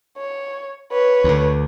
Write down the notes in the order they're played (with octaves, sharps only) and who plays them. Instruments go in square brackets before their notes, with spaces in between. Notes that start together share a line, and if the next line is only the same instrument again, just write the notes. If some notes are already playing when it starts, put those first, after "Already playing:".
[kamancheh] C#5
B4 C#5
[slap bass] D2 D3